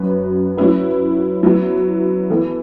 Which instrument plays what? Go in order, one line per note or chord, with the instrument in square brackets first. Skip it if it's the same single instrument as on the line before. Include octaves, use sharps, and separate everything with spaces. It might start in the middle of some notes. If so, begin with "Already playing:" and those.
Already playing: [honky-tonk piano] F#2 F#3 C#4 F#4 B4
F#3 C#4 E4 B4
F#3 B3 E4
E3 B3 E4 A4